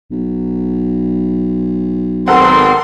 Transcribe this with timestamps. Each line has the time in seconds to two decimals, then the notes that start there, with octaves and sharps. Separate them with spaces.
0.11 B1
2.28 G#1 B3 C4 A4 A#4 F#5 C6